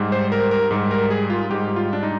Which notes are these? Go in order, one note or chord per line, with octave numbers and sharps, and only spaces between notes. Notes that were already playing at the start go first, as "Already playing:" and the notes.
Already playing: G#2 G3
C5
A#4
A#4
G#2 G3
A#4
G#4
F4
G#2 G3 G4
F4
D4
D#4